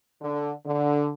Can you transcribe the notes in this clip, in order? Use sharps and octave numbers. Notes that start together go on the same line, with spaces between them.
D3
D3